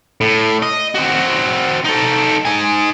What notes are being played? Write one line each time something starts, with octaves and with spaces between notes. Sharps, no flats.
A2
D#5
C4 F#4
D#4 A4
D#4 G#5